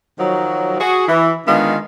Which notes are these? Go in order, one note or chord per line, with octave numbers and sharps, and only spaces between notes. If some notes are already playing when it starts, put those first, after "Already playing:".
D#3 F3 F#3
F#4 G#4
E3
D3 D#3 G#3 B3 F4